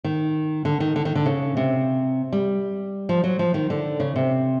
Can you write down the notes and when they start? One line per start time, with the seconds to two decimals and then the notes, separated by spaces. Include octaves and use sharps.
0.04 D#3
0.65 D3
0.80 D#3
0.96 D3
1.05 D#3
1.15 D3
1.26 C#3
1.57 C3
2.32 G3
3.09 F3
3.24 F#3
3.39 F3
3.54 D#3
3.70 D3
4.00 C#3
4.16 C3